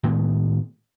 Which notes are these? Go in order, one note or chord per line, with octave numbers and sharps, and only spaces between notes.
A2 D#3 G#3 B3